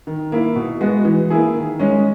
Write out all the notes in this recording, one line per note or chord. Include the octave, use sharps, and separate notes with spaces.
D#3
A#3 E4
B2
G#3 B3 F#4
E3
A#3 E4 G#4
D#3
G#3 C#4